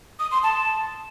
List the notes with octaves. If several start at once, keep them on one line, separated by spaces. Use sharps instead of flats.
D#6
C6
A5